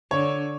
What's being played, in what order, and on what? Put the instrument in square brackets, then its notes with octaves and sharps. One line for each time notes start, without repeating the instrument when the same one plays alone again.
[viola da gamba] D3 [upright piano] C#5